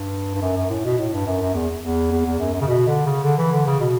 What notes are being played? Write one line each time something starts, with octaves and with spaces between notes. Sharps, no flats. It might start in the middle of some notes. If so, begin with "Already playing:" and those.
Already playing: G2
G2
F#2
F#2
A2
B2
A2
G2
F#2
F#2
E2
E2
E2
E2
F#2
F#2
C#3
B2
D3
C#3
D3
E3
D3
C#3
B2